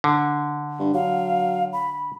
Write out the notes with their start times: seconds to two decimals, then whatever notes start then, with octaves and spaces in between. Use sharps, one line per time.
0.04 D3
0.80 G2
0.94 F#3 F5
1.73 B5